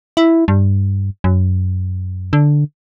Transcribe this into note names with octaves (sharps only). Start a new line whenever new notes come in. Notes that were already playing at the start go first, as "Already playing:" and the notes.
E4
G2
F#2
D3